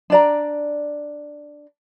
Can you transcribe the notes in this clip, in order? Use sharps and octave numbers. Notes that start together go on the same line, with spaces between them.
D4 D5 A#5